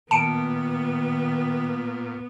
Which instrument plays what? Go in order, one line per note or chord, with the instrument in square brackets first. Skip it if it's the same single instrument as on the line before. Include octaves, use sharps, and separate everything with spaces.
[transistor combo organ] A#2 [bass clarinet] D#3 [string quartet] B3 [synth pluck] A5 C#7 D7